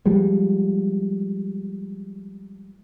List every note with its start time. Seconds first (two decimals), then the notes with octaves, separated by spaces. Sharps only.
0.06 F3 G3 G#3